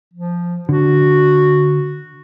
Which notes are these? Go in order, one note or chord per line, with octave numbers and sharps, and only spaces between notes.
F3
D3 F#4